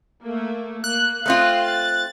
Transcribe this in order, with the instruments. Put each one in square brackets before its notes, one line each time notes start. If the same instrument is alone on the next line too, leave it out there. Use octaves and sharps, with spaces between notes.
[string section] A3 A#3
[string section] A#3 [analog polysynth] F#6
[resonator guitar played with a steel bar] A3 C4 F4 [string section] F5 C6 D#6
[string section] A6